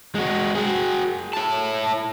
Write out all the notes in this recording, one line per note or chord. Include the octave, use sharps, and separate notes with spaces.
G#3 F#4
F#4 G#4
E4 A5